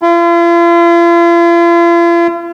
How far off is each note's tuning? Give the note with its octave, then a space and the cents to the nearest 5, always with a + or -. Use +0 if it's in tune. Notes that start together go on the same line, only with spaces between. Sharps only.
F4 -45